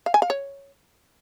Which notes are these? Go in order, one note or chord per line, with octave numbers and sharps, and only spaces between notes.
F5
G#5
F5
C#5